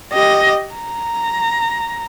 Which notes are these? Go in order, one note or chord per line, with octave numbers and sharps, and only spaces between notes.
G4 D#5
A#5